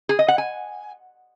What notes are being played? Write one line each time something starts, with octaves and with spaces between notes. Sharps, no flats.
G#4
D#5
F#5
G#5